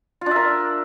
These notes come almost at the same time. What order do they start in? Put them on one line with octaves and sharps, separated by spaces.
F4 D4 E5 A#4